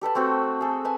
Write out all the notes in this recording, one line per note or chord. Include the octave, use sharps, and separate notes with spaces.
G4 A4 B4 A5
A3 C4 F#4 A4
G#4 A4
B4 G#5 A5